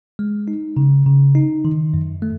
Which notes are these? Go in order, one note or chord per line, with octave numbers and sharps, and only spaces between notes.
G#3
D#4
C#3
C#3
D#4
D#3
F#2
A3